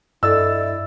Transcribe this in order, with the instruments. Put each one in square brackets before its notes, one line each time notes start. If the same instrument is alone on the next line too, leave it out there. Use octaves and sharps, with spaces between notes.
[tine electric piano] G2 A6 [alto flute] E4 [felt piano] A4 D5 D#5 [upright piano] E6